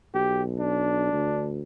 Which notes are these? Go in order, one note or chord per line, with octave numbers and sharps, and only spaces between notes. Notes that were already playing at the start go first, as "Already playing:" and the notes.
B1 G4
D4
D2